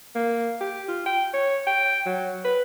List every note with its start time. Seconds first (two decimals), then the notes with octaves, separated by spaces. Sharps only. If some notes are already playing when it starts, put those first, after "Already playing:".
0.15 A#3
0.61 G4
0.88 F4
1.06 G5
1.34 C#5
1.67 G5
2.06 F#3
2.45 B4